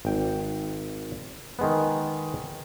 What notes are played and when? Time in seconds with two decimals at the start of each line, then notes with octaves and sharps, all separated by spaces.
0.05 G#1 G5
1.59 D#3 G#3 B3